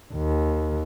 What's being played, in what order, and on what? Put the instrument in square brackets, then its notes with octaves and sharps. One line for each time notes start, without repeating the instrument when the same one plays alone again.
[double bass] D#2